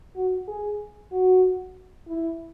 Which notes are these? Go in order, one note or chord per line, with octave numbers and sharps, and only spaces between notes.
F#4
G#4
F#4
E4